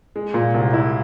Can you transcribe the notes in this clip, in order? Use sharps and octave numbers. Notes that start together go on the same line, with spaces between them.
G#3
A#2
C2
E4